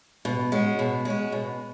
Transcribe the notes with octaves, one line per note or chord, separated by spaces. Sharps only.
B2
G#3 C#4 F#4
B2
G#3 C#4 F#4
B2